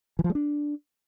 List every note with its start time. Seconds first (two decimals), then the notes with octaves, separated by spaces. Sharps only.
0.19 E3
0.24 F3
0.30 G#3
0.35 D4